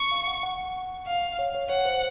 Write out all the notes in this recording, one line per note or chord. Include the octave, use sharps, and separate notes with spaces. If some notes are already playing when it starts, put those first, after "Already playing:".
Already playing: C#6
F5
F#5
F#5
F5
C#5
C#5
C#5 F#5
C5